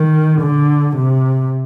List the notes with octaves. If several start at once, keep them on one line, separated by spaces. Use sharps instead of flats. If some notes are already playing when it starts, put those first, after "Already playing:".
Already playing: D#3
D3
C3